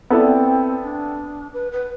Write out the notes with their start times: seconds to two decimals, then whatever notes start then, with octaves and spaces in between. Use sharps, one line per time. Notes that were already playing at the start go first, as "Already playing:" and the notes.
0.10 B3 C4 E4 A4 D5
0.83 D4
1.53 B4
1.72 B4